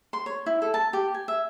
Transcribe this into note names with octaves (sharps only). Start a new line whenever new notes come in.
C6
C#5
E4
A4
A5
G4
G#5
E5